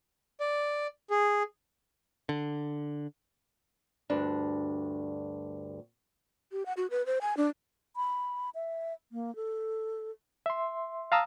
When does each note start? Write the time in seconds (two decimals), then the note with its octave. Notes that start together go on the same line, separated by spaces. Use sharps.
0.40 D5
1.10 G#4
2.29 D3
4.10 D2 G2 D4
6.52 G4
6.66 F#5
6.77 F#4
6.91 B4
7.06 C5
7.21 G#5
7.37 D4
7.96 B5
8.55 E5
9.12 A#3
9.36 A4
10.46 E5 C6
11.12 F5 A5 A#5 D#6 E6